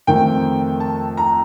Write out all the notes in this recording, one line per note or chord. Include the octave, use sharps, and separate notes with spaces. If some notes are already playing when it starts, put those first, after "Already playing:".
F2 D#3 A3 C4 G5
A5
A#5